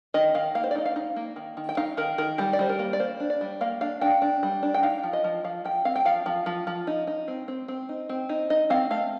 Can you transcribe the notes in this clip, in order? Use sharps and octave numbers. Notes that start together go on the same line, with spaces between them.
D#3 D#5
D#3 F5
A#3 F5
C5
D5
D#4 D#5
F5
D#4
A#3
D#3
D#3
G5
D#4 F5
D#3 A#4
D#3 A#4
G3 G4
D5
G3 C5
A#4
A#3
D5
A#3 C5
D4
D5
G3
A#3 F5
D4 F5
D4 G5
D4
G3
D4
G5
D#4 F5
F3
D#5
F3
F3 F5
F3 G5
C4 F5
G5
F3 F5
F3
F3
F3
D#4
D#4
C4
C4
C4
D#4
C4
D#4
D#4 D#5
C4 F5
A3 F5